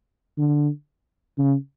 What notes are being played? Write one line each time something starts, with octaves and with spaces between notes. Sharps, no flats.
D3
C#3